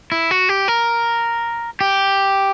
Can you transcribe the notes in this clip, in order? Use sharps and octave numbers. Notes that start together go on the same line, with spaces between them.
E4
F#4
G4
A#4
G4